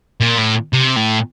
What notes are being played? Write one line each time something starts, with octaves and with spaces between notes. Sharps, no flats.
A#2
A2
C3
A2